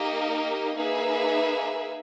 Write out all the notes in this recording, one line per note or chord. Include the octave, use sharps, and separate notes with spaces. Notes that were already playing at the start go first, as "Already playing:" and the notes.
Already playing: A#3 D#4 G4 A#4 D#5
A#3 D#4 G#4 B4 E5